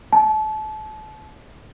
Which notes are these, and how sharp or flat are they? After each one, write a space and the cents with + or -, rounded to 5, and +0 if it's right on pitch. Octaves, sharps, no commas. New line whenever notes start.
A5 -30